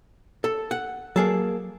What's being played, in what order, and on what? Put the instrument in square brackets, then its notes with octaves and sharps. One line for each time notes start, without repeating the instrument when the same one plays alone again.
[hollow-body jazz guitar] A4
F#5
[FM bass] F#3 [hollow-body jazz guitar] A#3 G#4 A4